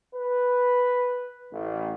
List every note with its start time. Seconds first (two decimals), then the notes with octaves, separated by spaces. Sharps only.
0.15 B4
1.52 A1